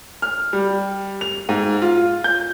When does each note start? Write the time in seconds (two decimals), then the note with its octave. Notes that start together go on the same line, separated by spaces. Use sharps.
0.22 F6
0.53 G3
1.21 F7
1.49 G#2
1.82 F4
2.24 G6